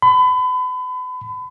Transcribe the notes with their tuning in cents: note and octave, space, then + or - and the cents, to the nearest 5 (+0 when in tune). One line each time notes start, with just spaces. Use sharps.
B5 +35